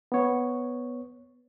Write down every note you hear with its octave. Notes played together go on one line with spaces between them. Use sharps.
B3 C#5